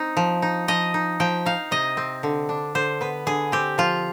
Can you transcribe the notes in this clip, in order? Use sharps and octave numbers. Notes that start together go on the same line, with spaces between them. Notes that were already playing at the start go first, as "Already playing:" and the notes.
Already playing: C4 D#4
F3
D#4
F3 D#5
D#4
F3 G5
D#4 F5
C3 D#5
C4
D3
D4
D3 C5
B3 B4
D3 G#4
C4 G4
F3 F4